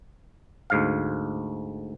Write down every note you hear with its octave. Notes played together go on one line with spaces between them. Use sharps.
D2 G#2 F5